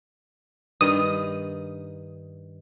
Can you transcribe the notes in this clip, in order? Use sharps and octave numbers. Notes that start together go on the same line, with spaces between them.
G2 D#3 D#6